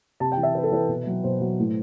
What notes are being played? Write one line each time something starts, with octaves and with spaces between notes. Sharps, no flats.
C3 A5
G5
E3
E5
C3 B4
A4
E3 B4
B2
F#3
B2 C5
F#3
A2